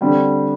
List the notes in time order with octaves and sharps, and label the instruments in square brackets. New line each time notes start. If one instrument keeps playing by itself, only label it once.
[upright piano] D3 G3 C4